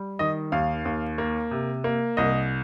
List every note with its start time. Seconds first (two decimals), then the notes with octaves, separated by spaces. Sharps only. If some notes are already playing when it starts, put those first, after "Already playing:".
Already playing: G3
0.19 D#3 D#5
0.52 D#2 F5
0.85 D#2
1.18 A#3
1.51 C3
1.84 A#3
2.17 C2 D#5